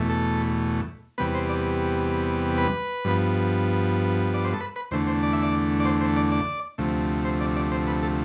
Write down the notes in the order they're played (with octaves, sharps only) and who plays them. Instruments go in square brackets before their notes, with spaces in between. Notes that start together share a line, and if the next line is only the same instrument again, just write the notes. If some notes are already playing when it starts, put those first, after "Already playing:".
Already playing: [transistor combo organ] E2 B2 A3
A4
E2 C3 G3 B3 B4
C5
D5
B4
G2 F3 B3
D5
C5
A4
B4
B4
E2 D3 A3 C5
C5
D5
E5
D5
D5
C5
C5
D5
D5
D2 C3 F3 A3
C5
D5
D5
C5
B4
A4